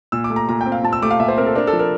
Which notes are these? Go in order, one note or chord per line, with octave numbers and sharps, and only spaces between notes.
A#2 E6
D6
A3
A#5
A#2 A#5
G5
C4
F5
A#2 A5
E6
A3 D6
F5
A#2 E5
C5
C4 A#4
A4
D4 A#4
A4
F3
A#4